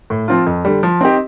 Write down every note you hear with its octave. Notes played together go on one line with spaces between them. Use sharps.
A2
F3 C4 F4
F2
D3 G3
F3
C4 D#4 G4